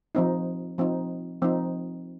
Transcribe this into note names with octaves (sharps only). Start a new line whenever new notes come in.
F3 C4 D#4
F3 C4 D#4
F3 C4 D#4